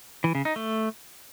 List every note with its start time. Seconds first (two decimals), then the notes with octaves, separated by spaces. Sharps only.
0.24 E3
0.35 C#3
0.45 D#4
0.56 A3